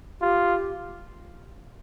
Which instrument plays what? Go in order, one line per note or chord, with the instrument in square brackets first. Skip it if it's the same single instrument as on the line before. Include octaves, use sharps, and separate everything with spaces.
[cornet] F4 [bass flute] G4